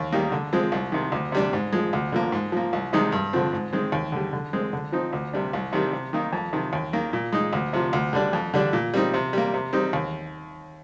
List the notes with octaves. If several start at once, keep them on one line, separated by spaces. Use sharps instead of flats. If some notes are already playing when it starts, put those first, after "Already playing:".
Already playing: D#2
D#3 G3 A#3 D#4
D3
F3 G#3 C4
C2
C3 D#3
D2
C3 G3 D4
G#2
F3 G#3
D2
D3 F3 A#3
G#2
F3 A#3
C2
C3 D#3 G#3 D#4
G2
D3 F3 C4
G#2
D#3 G#3 C4
D#2
D3 G3
D3
G#3 C4
D3
F3 C4 D#4
D2
C3 G3 D4
C2
C3 D#3 G3
C3
D#3 A#3 D#4
F2
C3 D#3
D#2
D#3 A#3
A#2
G#3 D#4
D2
C3 F3
D2
D3 G3 D4
F2
D3 G3 D4
A#2
G3 C4 D#4
C3
G3 A#3
C3
G3 C4 D#4
D#2